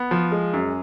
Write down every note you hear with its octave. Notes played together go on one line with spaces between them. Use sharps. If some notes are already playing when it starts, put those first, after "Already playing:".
Already playing: B3
F3
G#3
F#2